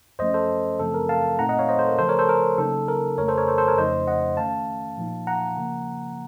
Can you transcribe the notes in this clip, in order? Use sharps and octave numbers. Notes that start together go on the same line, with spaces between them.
F#2 F3 A3 C#4 C5 D#5
A4 C5
F#2 C#3 F3 A3 C4 A4
A#4
F5 A5
A#2 A3 C4 D#4 F#5 A#5
D#5 F#5
C#5 F5
C5 D#5
A4 C5
A#4
C#3 F3 A3 A4 C5
A#4 C#5
A4 C5
A#4
C#3 F#3 A#3 D#4 A4
A#4
F2 C#3 A3 A#4 C#5
A4 C5
A#4 C#5
A4 C5
A4 C5
A#4 C#5
F2 C#3 F3 A3 D#4 C5 D#5
D#5 F#5
D#3 A3 C#4 F5 A5
A#2 F3 A#3 D#4
F#5 A#5
C#3 F3 A#3